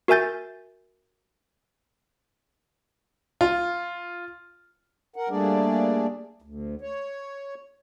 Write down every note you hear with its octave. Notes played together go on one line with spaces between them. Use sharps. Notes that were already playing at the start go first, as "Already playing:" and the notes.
F#4 A#4 E5 G#5 G6 A6
F4
A#4 F#5
G3 A3 A#3 D4 G#4 D5
D2
C#5